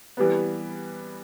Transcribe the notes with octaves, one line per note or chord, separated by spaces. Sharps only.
E3 G3 B3